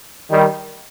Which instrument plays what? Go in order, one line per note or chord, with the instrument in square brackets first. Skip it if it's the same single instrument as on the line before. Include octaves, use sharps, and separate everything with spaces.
[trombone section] D#3 G3